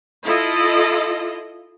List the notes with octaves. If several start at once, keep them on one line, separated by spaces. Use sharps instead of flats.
E4 F4 A4 D#5